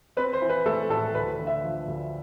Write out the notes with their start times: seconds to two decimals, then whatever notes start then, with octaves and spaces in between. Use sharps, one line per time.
0.17 C4 B4
0.33 C5
0.42 E3
0.49 B4
0.66 A3 A4
0.90 A2 A4
1.15 D2 B4
1.39 D3
1.47 E5
1.63 F3
1.88 D2